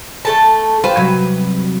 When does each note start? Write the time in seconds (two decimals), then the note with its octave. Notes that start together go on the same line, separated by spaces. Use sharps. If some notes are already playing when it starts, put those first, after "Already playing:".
0.25 A3 A4 A5
0.84 F4 G4 B4 C5
0.97 C3 F#3 G3